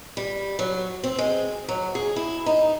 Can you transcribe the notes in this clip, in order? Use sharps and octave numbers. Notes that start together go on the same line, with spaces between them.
G3
F#3
C4
G#3
F#3
G#4
E4
D#4